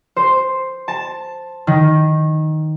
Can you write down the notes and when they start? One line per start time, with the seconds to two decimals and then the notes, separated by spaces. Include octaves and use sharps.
0.16 C5
0.88 A5
1.67 D#3